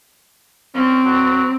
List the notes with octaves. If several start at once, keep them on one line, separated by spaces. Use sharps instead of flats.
C4 C#4
F#3